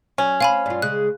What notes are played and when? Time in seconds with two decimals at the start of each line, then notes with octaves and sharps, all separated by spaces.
0.18 F#3 C#4
0.41 C4 F5 G#5 B5
0.66 G2 F4
0.82 C#3 G#3 F#6